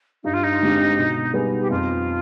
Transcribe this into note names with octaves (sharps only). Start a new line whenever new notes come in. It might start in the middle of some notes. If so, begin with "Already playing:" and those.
G2 D#4
F4
D#4
D3 G#3 C4 G4
B2
G3 B3 D#4 G#4
G4
F2 F4